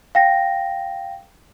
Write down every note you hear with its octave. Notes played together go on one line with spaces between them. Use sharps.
F5 G5 A#6